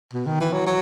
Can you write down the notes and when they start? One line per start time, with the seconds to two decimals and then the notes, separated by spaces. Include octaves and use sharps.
0.13 B2
0.27 D#3
0.41 E3
0.53 F#3
0.67 F#3